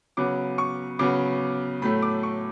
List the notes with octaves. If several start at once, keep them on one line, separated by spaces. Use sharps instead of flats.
C#3 F#3 B3 D6
C#6
C#3 F#3 B3 D6
A2 F#3 A3 B5
D6
C#6